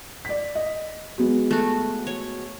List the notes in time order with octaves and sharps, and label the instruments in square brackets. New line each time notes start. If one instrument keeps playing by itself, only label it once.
[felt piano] D5 B6
D#5
F#3 G#3 B3
[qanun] A3 F#4
C#5